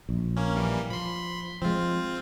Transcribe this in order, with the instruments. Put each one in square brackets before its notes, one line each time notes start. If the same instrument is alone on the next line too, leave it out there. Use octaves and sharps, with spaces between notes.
[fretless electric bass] A#1
[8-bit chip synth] A#3 C#4
E3 G3 A#3
[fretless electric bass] F3 [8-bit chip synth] B5 C6
[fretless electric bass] F3 G#3 [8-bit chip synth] C4 F4